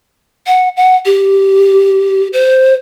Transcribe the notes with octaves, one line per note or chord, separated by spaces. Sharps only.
F#5
F#5
G4
C5